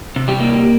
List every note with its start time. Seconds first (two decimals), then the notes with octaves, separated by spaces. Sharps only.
0.16 C3
0.28 G3 G4
0.40 A#3